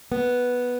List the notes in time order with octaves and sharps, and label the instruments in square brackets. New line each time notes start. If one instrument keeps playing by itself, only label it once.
[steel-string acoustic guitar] B3